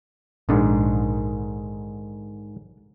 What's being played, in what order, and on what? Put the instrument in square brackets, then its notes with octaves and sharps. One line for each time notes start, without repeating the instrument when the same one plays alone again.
[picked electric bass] A#1 D4 [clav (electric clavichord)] G#2 D3 D#3